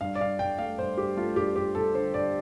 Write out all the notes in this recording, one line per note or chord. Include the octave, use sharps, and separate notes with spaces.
G2 F5
D5
G2 F5
G2 G5
A3 F5
G2 C5
G2 G4
A3 F4
G2 G4
G2 G4
G2 A4
D3 C5
G2 D5